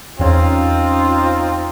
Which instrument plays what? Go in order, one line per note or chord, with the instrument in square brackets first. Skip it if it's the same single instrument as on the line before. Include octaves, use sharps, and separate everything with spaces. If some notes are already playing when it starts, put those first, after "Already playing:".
[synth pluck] E2 C#4 [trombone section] C4 D#4 F4